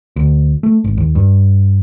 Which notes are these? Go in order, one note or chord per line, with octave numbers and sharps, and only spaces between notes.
D2
A3
G#1
D#2
G2